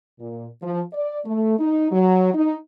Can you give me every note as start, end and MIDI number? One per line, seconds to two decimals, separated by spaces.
0.19 0.47 46
0.63 0.81 53
0.92 1.18 74
1.25 1.56 57
1.59 1.88 63
1.91 2.29 54
2.34 2.55 63